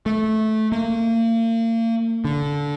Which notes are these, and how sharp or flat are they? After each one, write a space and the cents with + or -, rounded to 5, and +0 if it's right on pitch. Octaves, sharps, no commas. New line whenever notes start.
A3 -15
A#3 -35
D3 -20